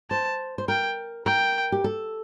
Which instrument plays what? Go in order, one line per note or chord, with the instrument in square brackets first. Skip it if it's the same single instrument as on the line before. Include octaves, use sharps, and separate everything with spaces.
[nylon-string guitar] C5 [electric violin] A5
[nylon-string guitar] C5
[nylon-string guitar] A#4 [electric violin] G5
[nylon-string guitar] A#4 [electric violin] G5
[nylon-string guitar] G4
A4